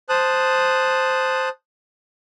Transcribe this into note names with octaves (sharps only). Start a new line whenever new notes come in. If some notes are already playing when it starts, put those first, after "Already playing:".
C5 A5 D#6 F#6